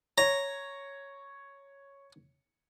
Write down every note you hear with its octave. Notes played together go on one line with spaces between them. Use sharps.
C#5 A#5